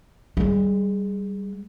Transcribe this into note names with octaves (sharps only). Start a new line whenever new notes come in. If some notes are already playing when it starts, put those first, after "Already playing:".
G3 G#3